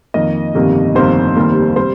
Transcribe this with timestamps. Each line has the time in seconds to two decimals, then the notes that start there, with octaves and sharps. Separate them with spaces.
0.14 F2 D#3 A#3 D#5
0.55 G1 F2 C3 D#3 A#3
0.95 G1 F2 C3 D#3 A#3 C5
1.36 F1 D#2 D#3 G3 A#3
1.76 C3 G3 C5